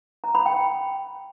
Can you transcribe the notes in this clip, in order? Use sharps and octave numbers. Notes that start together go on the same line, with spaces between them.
A#5
B5
G5